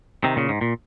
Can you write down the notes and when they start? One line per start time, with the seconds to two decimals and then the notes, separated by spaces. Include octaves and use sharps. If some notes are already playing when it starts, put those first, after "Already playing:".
0.24 C3 D#3
0.36 A#2 C#3
0.49 G#2
0.61 A#2